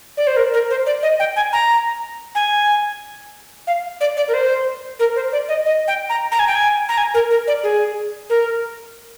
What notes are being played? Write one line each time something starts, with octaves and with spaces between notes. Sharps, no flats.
D5
C5
A#4
A#4
C5
D5
D#5
G5
G#5
A#5
G#5
F5
D5
D5
A#4
C5
A#4
C5
D5
D#5
D#5
G5
A#5
A#5
G#5
G5
G#5
A#5
G#5
A#4
A#4
D5
G#4
A#4